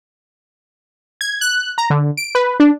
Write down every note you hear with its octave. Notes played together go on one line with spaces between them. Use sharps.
G#6
F#6
A#5
D3
D7
B4
D4